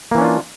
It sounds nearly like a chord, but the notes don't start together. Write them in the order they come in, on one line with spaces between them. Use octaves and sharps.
A#3 E3 C#4 D4 F4